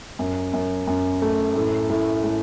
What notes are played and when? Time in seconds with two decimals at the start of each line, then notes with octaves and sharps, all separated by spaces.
0.19 F#2
0.53 F#2
0.87 F#2
1.22 A3
1.55 A2
1.90 A2
2.24 A2